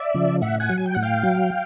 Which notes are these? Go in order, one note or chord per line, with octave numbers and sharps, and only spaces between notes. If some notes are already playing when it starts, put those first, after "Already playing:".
Already playing: D5 E5
C#3 F3
A2 E5 F#5
F#5 G#5
F#3
G#5
G5
A2 F#5
F5 G5
F#3